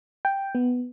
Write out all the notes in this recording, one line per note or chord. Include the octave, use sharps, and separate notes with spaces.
G5
B3